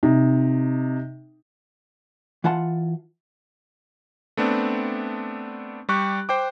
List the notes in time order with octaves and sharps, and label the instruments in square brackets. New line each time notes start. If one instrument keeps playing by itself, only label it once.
[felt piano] C3 D#4
[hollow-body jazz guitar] E3 F4 F#5 A5 C6
[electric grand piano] A3 B3 C4 D4
G3 G4 C#6 F#6
C5 G5 D6